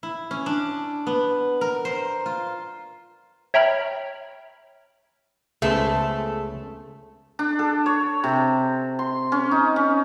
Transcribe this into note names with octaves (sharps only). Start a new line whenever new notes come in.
E4
C#4
D4
B3
A#4
C5
F4
C#5 E5 G5 A#5 B5 F6
C#2 C#3 A3 B3 A4 C5
D4
A4
C#5
C3
C6
C#4
D#4
C#4